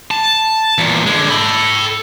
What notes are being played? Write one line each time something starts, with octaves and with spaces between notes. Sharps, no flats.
A5
E2 A#2
D3 G#3
A4 B5